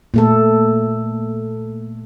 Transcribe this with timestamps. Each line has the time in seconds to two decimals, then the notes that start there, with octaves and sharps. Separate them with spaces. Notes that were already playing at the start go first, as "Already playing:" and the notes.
0.14 A#2 A3 A4